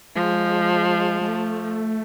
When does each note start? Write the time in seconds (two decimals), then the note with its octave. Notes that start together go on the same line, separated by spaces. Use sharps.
0.15 F3 G#3
1.21 G#3
1.28 A3